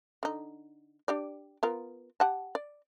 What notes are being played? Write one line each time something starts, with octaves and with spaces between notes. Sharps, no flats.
D3 D#4
D4 G4 D5
B3 F4 A#4
G4 F#5 A5
D5